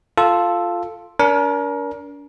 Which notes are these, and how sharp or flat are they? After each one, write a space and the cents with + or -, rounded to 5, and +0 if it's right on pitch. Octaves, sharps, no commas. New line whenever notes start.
F4 +0 A4 +0
D4 -40 A#4 +25